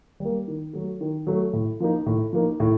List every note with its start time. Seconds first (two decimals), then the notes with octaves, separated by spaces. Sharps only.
0.20 G3 A#3
0.48 D#3
0.73 F#3 A3
1.01 D#3
1.27 F#3 A3
1.53 A2
1.80 F3 A#3 D#4
2.06 A2
2.33 F3 A#3 D#4
2.60 A2